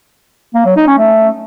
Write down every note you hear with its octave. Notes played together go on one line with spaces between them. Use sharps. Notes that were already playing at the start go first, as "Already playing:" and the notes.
A#3
F#3
D#4
C#4
A3